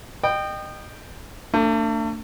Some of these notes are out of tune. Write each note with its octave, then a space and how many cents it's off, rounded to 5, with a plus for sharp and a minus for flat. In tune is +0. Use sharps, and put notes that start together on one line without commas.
D#5 -30 G5 +0
A3 +40 D4 +0